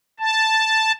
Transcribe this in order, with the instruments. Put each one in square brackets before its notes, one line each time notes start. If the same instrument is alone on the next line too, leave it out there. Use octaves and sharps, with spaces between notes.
[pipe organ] A5